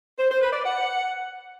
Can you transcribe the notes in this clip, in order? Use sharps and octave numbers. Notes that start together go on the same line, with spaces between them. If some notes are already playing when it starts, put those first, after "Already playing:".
C5
C5
B4
D5
F#5